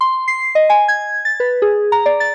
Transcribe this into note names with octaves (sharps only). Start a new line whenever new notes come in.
C6
C7
D#5
G#5
G#6
A6
B4
G#4
A#5
D5
A6